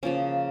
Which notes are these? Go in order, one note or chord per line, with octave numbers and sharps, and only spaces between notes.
C#3 F3 A#3 C#4